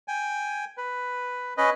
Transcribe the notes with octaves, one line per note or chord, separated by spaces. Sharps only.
G5 G#5
B4
C#4 B4 D#5